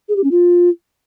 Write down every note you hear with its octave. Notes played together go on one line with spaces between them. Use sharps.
G#4
G4
C#4
F4